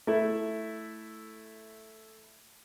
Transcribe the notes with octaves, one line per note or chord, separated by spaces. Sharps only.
A3 E4